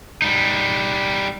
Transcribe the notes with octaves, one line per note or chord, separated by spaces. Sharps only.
G3 D#4